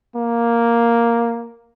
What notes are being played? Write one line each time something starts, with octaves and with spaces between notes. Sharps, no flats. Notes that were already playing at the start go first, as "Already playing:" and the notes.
A#3